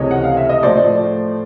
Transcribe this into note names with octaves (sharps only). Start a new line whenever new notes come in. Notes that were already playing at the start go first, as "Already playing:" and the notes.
Already playing: C#2 C3 E3 A3 C#5 D#5
F#5
F5
E5
D#5
A2 F3 A3 C5 D5